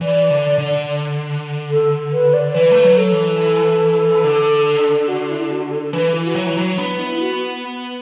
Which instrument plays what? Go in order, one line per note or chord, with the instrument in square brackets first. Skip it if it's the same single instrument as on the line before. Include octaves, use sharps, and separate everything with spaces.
[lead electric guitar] E3 [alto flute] D5
[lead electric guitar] D3
D3
[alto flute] A4
B4
D5
[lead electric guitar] E3 [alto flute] B4
[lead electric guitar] A3
F#3
[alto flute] A4
[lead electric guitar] E3
D3
[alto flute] F#4
E4
A4
F#4
F#4
A4
A4
[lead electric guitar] E3 [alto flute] B4
[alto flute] E4
F#4
[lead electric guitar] F#3 [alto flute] E4
[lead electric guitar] E3
[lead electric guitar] F#3 [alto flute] F#4
[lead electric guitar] B3 [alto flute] D4
[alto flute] E4
F#4